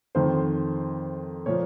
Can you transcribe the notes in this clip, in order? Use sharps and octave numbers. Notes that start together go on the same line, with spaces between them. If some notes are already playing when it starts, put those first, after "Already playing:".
F2 D#3 C5
A#2 F3 C#5